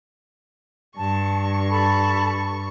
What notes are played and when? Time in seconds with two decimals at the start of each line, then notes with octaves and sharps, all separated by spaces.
0.98 G2 A5 C#6
1.70 A4 A5 B5